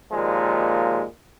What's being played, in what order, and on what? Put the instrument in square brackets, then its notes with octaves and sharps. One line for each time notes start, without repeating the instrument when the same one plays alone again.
[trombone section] D#2 A#2 F3 G#3